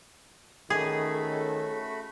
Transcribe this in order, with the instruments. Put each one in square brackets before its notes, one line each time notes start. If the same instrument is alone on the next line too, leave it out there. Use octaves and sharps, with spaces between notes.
[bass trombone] D#3 [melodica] A3 F#4 B5 [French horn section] C#4 A4 [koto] G#4